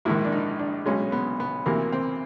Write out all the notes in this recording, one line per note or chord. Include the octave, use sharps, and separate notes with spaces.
A#1 G#2 D#3 E4
D4
D#4
D4
B1 B2 G#3 C#4
B3
B3
D2 C3 E3 A#3
C4